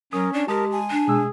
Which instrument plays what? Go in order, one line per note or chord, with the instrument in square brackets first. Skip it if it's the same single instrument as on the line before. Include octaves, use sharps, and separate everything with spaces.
[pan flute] F#3 [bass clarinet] C#4 [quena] A#4 [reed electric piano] D#6
[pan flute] D4 [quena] D5
[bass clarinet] G#3 [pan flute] G4 [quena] A#4 [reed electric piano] A5 D#6
[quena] G#5
[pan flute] D4
[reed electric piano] B2 G#3 E6 [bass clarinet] G#4